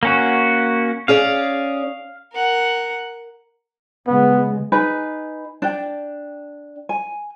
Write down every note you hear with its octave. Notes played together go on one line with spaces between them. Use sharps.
A#3 C#4 F#4
C#4 G#4 D5 F5
A#4 F#5
C#3 G#3 B3
D#4 G#4 B4
D4 G5
G#5